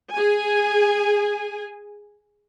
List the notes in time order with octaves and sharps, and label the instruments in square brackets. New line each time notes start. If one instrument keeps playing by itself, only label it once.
[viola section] G#4 G#5